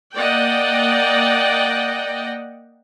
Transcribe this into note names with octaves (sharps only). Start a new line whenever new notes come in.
A#3 D5 D#5 F#5 G5